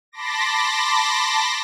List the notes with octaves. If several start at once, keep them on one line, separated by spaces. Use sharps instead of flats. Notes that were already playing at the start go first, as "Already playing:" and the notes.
A5 B5 C6 D6 A#6